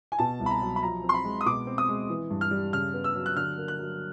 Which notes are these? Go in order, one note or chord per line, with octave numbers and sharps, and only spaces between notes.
G#5
B2 A5
C2
B5
A#5
F#3
B5
F3 A#5
C4
C6
B5
G#3
D#6
B2 D6
C4
D#6
G#3
E3
G2
F6
G3
C#3 F6
B3
E6
F#3
F#6
D3 F6
A#3
F#6
F#3